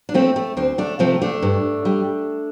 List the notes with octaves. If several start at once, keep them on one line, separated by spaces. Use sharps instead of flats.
D4
F3 A3 C4
A3
D2 C4
A3 D4
C3 F3 A3 C4
A3 D4
G2
G3